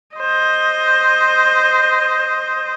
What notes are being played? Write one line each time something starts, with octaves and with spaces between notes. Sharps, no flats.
C5 D#5